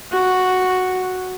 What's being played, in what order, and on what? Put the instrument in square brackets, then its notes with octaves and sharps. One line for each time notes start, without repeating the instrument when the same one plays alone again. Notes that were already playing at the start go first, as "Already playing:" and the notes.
[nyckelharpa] F#4